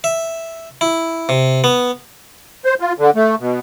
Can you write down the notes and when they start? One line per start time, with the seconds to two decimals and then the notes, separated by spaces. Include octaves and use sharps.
0.04 E5
0.81 E4
1.29 C3
1.64 B3
2.65 C5
2.80 F4
2.99 D3
3.16 A3
3.40 B2